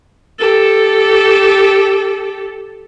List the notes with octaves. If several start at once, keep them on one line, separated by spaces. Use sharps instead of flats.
G4 A4